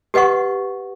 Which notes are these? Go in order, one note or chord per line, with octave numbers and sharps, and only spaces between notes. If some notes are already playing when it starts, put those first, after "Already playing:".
G4 B4 D#5 F#5 C#6